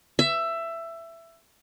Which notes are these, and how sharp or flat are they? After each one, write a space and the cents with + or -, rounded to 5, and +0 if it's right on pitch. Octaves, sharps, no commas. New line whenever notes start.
E5 +15